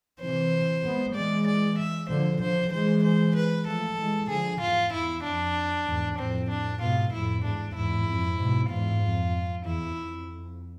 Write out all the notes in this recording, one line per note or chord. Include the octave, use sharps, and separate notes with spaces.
C3 E3 C5
G#3 B3
E3 G#3 D5
D5
E5
D3 F3 C5
D3 F3 C5
E3 G#3 C5
C5
B4
F3 A3 A4
E3 G#3
D3 F3 G#4
E2 G#2 F4
E2 E4
F2 D4
E2 G#2
F2 A2 C4
D4
G#2 B2 F4
F2 A2 E4
E2 G#2 D4
E2 G#2 E4
F2
G#2 B2
E2 G#2 F4
F2
E2 E4
F2